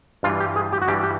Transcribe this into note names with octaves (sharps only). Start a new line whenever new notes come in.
G2 E3 G3 F4
G4
G#4
G4
F#4
G2 E3 G3 G4
G4